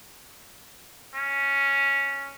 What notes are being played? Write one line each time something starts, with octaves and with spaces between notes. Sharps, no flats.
C#4